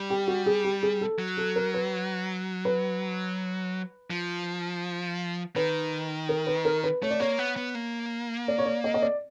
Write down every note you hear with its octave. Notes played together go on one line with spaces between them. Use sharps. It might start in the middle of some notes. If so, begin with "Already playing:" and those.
Already playing: G3
G4
F#4
G#4
G4
G#4
A4
F#3
A4
A#4
B4
B4
F3
D#3 B4
A#4
B4
A#4
B4
A3 C#5
D5
A#3 C#5
B3
B3
A#3
D5
C#5
D5
D#5
D#5
D5